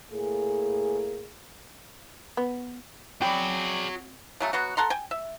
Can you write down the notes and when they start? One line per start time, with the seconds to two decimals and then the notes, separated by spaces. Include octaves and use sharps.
0.12 A2 A#3 G#4
2.37 B3
3.22 C4 F#4 G#4 C#5 D5 G5 B5 D6
4.40 C#3 F#3 A3
4.53 F#3 B3 F#4
4.77 A4 F#5 A#5 C6
4.90 G5 G#5
5.11 E5